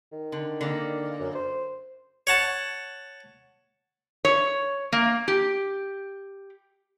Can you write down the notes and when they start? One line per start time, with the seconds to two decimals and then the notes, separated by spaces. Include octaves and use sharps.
0.12 D#3
0.32 D3
0.61 D3 A#3
1.20 F#2
1.35 C5
2.27 C#5 F#5 A5
4.25 C#5
4.92 A#3
5.28 G4